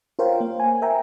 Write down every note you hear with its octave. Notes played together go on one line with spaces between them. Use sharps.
F4 A#4 C5 C#5 F5 G5
A#3
G#5
A#4 E5 G5 G#5 A#5